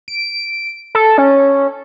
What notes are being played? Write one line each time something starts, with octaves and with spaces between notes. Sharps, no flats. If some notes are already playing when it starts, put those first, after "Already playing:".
D7
A4
C#4